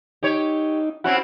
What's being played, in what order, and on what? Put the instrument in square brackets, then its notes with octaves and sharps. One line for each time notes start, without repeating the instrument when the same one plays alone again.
[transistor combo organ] D#4 [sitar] G4 C#5
[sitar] C4 C#4 E4 [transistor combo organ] F#4 F#5